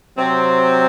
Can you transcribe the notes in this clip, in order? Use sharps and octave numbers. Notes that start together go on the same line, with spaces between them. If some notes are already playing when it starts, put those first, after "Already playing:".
C3 F#3 C4